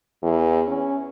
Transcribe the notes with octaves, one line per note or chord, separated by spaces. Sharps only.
E2
C#4